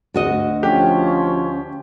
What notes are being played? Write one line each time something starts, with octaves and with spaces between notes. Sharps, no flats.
D2 F#4 D#5
F3 C#4 G4